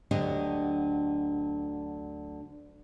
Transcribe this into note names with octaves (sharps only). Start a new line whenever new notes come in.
D2 D3 F#3 D4 G4 D#5